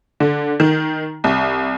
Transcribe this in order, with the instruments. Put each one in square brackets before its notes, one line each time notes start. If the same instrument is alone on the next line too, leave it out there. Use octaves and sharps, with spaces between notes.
[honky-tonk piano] D3
D#3
C2